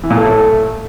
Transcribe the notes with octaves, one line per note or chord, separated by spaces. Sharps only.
E3
A#2
A3
A2
A3